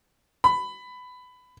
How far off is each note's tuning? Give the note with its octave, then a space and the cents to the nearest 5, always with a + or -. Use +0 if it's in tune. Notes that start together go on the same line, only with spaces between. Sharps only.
B5 +15